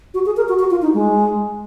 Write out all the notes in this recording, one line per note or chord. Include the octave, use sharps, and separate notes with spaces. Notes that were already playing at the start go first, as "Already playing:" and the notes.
F#4
G#4
A#4
F#4
F#4
F4
D#4
G#3